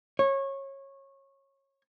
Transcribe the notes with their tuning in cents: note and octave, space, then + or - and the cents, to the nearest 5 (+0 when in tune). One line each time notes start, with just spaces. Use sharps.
C#5 -20